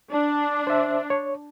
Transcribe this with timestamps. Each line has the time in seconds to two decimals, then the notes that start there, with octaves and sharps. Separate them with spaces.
0.11 D4
0.67 C5 E5
1.10 C#5